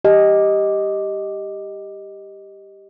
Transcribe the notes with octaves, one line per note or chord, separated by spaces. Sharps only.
G4 D#5